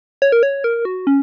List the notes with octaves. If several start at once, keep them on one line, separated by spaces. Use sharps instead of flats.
C#5
A#4
C#5
A#4
F#4
C#4